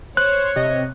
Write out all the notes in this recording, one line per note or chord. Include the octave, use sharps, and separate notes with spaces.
C5 C#5 F#6
C3 D#5